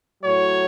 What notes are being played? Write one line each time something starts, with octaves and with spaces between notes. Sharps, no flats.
A2 F#3 C#5